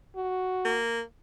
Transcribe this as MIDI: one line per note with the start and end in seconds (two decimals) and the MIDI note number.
0.16 0.81 66
0.65 1.02 58